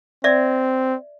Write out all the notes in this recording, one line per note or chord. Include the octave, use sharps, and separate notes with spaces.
C4 D5 E5